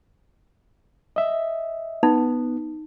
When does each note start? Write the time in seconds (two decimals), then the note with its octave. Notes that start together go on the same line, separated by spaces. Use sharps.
1.16 D#5 E5
2.03 B3 D#4